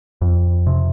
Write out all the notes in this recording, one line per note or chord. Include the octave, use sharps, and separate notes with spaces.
F2
C3